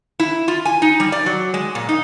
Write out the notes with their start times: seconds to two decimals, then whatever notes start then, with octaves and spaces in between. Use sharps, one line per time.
0.20 E4
0.48 F4
0.65 G#5
0.82 D#4
1.00 G3
1.12 D5
1.26 F#3
1.54 G#3
1.75 A#2
1.89 D#4